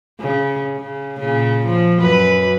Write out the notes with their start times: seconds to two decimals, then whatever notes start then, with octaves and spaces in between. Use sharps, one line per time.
0.21 C#3
0.76 C#3
1.19 A#2 C#3
1.65 F3
2.01 F#2 B4